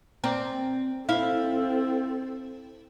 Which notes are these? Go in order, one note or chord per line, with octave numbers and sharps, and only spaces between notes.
C4 A#4 D5
C4 E4 A4 C5 F5